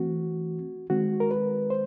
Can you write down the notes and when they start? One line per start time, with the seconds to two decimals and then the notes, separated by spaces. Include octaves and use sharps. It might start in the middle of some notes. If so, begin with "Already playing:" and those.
Already playing: E3 A3 C4 F#4
0.90 D#3 G#3 C4 F#4
1.20 A#4
1.31 B4
1.70 C5